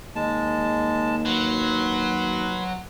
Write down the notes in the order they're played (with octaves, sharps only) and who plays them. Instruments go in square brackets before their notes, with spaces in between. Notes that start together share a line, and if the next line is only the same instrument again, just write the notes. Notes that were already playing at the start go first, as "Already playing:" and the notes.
[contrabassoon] D#2 [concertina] G#3 A5
[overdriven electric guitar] F#3 [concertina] B4 C6